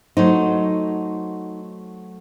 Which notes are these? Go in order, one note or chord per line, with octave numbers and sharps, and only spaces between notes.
F#3 A3 D#4 C5